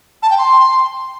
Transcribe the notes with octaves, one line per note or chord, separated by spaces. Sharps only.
A5
G5
C6